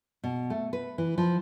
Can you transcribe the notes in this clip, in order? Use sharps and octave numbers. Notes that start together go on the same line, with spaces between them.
B2
A3
B4
E3
F3